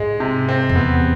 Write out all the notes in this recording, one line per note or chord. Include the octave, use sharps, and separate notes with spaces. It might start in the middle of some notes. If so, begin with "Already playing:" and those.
Already playing: G#2 G#3
C3
C4
F2
E2 B3